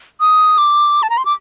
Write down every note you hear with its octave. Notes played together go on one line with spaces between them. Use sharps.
D#6
D6
A5
A#5
C6
D6